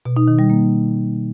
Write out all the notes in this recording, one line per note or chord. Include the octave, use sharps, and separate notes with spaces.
B2
D#4
D#3
G3
A#3